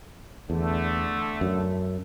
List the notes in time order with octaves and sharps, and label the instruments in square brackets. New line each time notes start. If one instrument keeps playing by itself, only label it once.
[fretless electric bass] E2 [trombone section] D3 A3
[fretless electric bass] F#2